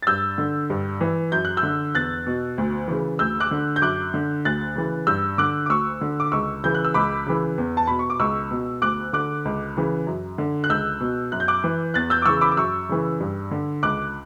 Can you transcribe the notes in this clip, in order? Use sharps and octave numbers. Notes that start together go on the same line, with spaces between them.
A6
G2 E6 G6
D3
G2
E3
F#2 G6
F#6
E6 G6
D3
E2 F#6 A6
B2
D2
C#3 E3
D2 E6 G6
D6 F#6
D3
G6
F#2 D6 F#6
D3
D2 F#6 A6
C#3 E3
G2 E6 G6
D3 D6 F#6
D6
D2 C#6 E6
D3
D6
C#2 C#6 E6
C#3 E3 G6
F#6
E6
C#2 B5 D6
C#3 E3
E2
A5
B2 B5
C#6
D6
C#2 C#6 E6
B2
D2 D6 F#6
D3 D6 F#6
C#2
C#3 E3
F#2
D3
F#6
C#2 E6 G6
B2
F#2 F#6
G6
D6 F#6
E3
E2 F#6 A6
E6 G6
D6
C#3 E3 C#6 E6
B5 D6
D6
F#2 C#6 E6
C#3 E3
G2
D3
C#2 D6 F#6